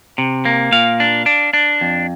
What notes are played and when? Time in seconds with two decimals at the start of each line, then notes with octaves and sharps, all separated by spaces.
0.18 C3
0.45 A#3
0.72 A#2 F5
1.00 D4
1.26 D4
1.53 D4
1.81 F2